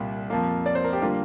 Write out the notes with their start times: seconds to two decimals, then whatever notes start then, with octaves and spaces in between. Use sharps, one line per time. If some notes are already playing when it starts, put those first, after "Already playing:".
Already playing: C2 A#2 G3
0.30 F2 F3 A#3
0.66 D5
0.75 C5
0.84 A#4
0.93 G4
1.01 D3 G3 A#3 F4